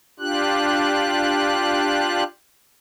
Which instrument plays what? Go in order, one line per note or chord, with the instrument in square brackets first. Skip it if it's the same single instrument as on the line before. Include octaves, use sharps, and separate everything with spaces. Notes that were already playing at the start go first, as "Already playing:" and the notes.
[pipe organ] D4 F4 G4 F#6